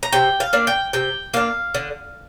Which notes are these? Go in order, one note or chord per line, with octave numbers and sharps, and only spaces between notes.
A#5
C3 G5
F5
A#3 D4
G5
C3 G5
A#3 D4 F5
D3